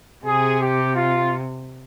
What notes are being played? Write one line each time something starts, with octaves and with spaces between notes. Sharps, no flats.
C3 G#4
G4
F4